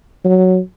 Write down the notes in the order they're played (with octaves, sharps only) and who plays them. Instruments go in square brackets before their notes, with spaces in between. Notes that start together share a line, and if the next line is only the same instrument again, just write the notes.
[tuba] F#3